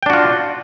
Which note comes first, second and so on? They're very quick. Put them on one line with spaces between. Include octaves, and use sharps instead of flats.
G5 D4 F#4 F4